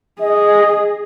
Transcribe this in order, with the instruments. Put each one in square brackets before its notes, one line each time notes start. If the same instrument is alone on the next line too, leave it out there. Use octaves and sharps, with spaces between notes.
[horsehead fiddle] G#4 [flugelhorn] D#5